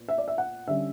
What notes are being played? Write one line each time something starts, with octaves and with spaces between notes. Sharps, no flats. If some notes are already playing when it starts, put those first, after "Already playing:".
Already playing: A#2 B3
E5
D5
E5
F#5
D3 G3 C#4 E5